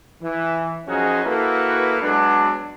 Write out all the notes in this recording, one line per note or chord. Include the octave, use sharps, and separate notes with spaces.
E3
F#2 F3 C#4 D#4 F#4 G#4
A#3 E4 F#4 A4 B4
F#3 G#3 B3 D4